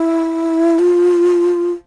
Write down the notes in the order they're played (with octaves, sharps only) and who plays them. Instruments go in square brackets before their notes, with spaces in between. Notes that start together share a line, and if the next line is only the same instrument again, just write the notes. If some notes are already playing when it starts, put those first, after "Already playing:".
Already playing: [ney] E4
F4